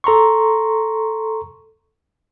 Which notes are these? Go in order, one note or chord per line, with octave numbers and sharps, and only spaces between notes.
A4 A#5 C6 C#6